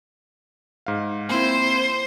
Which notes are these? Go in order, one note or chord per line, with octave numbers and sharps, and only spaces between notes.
G#2 F5
A#3 C4 E4 C5